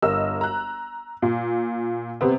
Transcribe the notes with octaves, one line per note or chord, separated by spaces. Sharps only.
G1 A#4 D#5 E6
A#5 F#6
A#2
C3 B3 C4